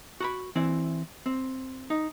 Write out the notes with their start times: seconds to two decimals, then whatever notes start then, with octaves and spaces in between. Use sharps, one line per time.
0.20 F#4 A#5 B5
0.56 E3 C4 E4
1.26 C4
1.90 D#4